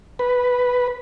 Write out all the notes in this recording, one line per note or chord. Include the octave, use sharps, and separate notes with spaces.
B4